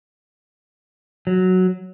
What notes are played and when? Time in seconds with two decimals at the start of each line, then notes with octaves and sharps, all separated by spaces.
1.27 F#3